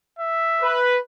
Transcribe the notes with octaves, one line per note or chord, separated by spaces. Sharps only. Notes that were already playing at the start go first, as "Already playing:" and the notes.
E5
B4